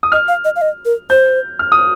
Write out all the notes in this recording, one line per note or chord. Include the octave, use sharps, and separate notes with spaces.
D#6
D#5 F6
F5
D#5
F5
D#5
A#4
C5 G6
F6
D#6